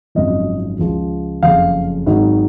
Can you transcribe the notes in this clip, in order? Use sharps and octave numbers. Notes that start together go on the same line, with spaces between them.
G#1 F#2 C#3 F3 D#5
C#2 C#3 F3
F#1 F2 C#3 F5
G#1 G#2 D#3 F#3